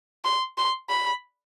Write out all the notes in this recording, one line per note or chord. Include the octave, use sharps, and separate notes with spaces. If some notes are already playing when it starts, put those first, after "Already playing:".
C6
C6
B5